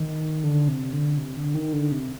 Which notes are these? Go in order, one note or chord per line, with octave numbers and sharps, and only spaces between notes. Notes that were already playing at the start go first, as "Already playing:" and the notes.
Already playing: D#3
D3
C3
D3
C3
D3
D#3
D3
C3